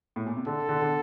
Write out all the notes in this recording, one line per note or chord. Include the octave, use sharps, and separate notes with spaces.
A2
A#2
C3
D3 A4
D3
D3